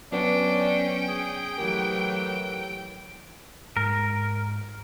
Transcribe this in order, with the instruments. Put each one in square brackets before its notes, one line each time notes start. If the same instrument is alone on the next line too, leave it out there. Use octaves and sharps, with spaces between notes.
[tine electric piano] F#3 B3 B4 [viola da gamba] C#4 [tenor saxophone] D4 [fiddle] G5
[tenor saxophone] G#4
[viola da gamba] E3 F#3 A3 [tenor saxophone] G4 [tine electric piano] A#4
[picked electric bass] G#2 [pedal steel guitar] A#4